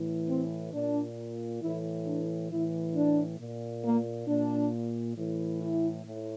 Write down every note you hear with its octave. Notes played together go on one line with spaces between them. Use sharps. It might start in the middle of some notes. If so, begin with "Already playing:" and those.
Already playing: A2 E3
C4
A#2 D4
A2 E3 E4
D4
A2 E3 E4
D4
A#2
A#3
A#2 D4
A2 E3
E4
A2